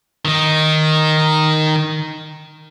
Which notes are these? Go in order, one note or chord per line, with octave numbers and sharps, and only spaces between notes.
D#3 D#4